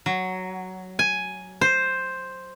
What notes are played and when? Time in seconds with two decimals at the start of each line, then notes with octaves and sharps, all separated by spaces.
0.06 F#3
0.99 G#5
1.61 C5